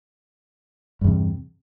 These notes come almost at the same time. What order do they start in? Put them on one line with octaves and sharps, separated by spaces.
G2 E2 C3